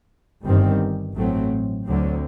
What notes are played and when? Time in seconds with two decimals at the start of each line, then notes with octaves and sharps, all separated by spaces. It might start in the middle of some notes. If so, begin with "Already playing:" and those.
0.45 G1 G2 D#3 G3 C4
1.15 A1 A2 F#3 A3 C4
1.85 D2 D3 F#3 C4